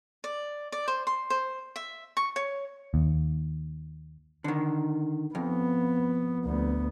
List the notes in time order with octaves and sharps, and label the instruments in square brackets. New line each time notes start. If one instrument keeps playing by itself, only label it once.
[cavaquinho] D5
D5
C5
C6
C5
E5
C#6
C#5
[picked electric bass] D#2
[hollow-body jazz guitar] D3 D#3
[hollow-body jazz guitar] F2 [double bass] B3
[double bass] D2 B3